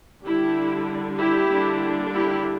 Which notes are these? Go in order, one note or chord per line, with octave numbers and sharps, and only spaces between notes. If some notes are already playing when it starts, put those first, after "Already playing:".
D3 G3 D4 E4 G4
E4 G4
D3 G3 A#3 D4
E4 G4